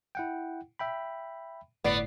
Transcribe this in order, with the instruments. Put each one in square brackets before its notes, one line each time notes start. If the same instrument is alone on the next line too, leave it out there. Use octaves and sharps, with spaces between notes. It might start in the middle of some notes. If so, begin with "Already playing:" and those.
[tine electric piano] E4 F#5 G5
E5 G5 B5
[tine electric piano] G1 A2 C7 [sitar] B3 D5